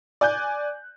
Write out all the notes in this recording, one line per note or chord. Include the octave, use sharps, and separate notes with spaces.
D5 G#5 F#6 G6